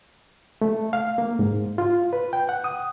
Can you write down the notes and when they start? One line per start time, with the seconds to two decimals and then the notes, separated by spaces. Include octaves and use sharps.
0.62 A3
0.93 F5
1.18 A#3
1.39 G#2
1.78 F4
2.13 B4
2.33 G5
2.49 F#5
2.64 D#6